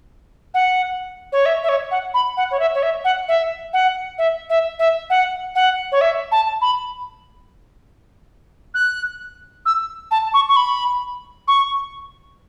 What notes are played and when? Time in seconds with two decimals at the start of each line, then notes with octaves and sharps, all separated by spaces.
0.54 F#5
1.32 C#5
1.46 E5
1.64 E5
1.69 C#5
1.91 F#5
2.14 B5
2.37 F#5
2.51 C#5
2.60 E5
2.75 C#5
2.83 E5
3.04 F#5
3.28 E5
3.73 F#5
4.18 E5
4.50 E5
4.79 E5
5.10 F#5
5.55 F#5
5.92 C#5
6.01 E5
6.32 A5
6.62 B5
8.74 F#6
9.66 E6
10.11 A5
10.34 C#6
10.48 C#6
10.56 B5
11.48 C#6